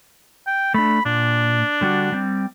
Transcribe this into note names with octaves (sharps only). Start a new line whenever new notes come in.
G5
A3 D4 B5
A#2 D4
D3 G3 F#4
G3 C4